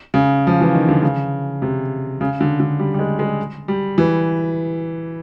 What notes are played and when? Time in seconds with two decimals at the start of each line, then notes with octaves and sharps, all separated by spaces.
0.14 C#3
0.47 F3
0.61 E3
0.75 D#3
0.89 D3
1.03 C#3
1.62 C3
2.21 C#3
2.41 D3
2.60 D3
2.79 G3
2.94 G3
2.99 G#3
3.19 G#3
3.68 G3
3.98 E3